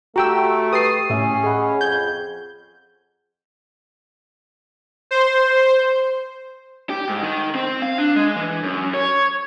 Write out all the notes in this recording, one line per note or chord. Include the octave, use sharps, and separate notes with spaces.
A3 F#4 G4 A#5 C#6 E6 D7
G4 B4 C#6 D#6 A6 C7 D#7
A2 C#4 G4 E5
G#4 D#5 F#5 B5
F2 G6 G#6
C5
G4
G#2
D#3
C4
F5
D4
G#3
E3
F#2
C#5